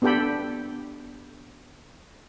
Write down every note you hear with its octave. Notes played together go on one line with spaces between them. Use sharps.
B3 D4 G4 A4 G5 B5